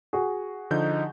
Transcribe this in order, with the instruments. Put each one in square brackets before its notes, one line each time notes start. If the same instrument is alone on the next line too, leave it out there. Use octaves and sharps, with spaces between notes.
[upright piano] F#4 G#4
[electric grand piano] D3 F3 G6 [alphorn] D#4